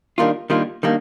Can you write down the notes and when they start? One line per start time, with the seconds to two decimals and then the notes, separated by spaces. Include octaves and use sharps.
0.18 D#3 G3 A#3 D4 F4
0.50 D#3 G3 A#3 D4 F4
0.83 D#3 G3 A#3 D4